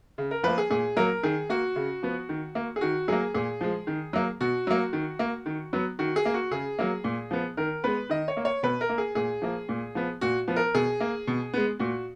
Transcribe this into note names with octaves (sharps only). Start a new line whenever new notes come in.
C#3
A#4
F3 A#3 B4
G#4
A#2 G#4
F#3 A#3 A#4
D#3 G#4
A#3 F#4
C#3
F3 B3
D#3
A#3
G#4
D#3 F#4
F#3 A#3 G#4
A#2 G#4
F3 G#3
D#3
F#3 A#3
B2 F#4
F#3 A#3
D#3
A#3
D#3
F#3 B3
D#3 F#4
G#4
A#3
F#4
C#3 G#4
F#3 A#3
A#2
F3 B3
D#3 A#4
G#3 B3 B4
D#3 D#5
C#5
A#3
C#5
B2 B4
A#4
A#3
G#4
A#2 G#4
F3 A#3
A#2
F3 B3
A#2 F#4
F3 B3
A#4
B2 G#4
A#3
B2
G#3 B3
A#2 F#4